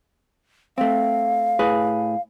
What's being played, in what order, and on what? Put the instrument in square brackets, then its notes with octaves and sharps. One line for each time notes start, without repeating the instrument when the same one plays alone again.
[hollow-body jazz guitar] A3 C4 [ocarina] F5
[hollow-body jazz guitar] A2 G#4 B4